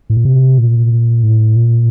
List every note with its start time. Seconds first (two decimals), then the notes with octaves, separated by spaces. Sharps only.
0.10 A2
0.17 A#2
0.25 C3
0.58 A#2
1.23 A2
1.56 A#2